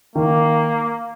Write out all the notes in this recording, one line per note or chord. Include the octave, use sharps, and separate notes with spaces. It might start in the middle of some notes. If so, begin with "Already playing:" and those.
D#3 A#3